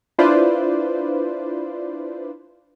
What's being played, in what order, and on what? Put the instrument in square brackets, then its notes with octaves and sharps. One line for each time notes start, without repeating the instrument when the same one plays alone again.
[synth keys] D4 E4 F4 B4 C5 D5